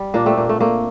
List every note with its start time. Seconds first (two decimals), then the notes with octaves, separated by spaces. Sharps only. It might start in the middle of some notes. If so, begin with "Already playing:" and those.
Already playing: G3
0.14 A#2 A#3 D4
0.26 A3 C4
0.37 A#2 A#3
0.49 A3
0.61 A3 A#3